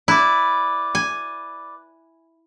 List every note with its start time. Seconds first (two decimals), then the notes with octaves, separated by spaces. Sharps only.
0.08 E4 B4 D5
0.95 G#5